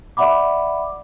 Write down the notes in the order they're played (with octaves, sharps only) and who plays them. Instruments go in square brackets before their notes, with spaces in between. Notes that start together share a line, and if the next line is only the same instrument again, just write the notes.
[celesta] D5 E5 F#5 B5 D6